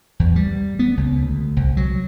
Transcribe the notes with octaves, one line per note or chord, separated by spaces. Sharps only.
E2
G3
B3
C#2
D2
C2
F#3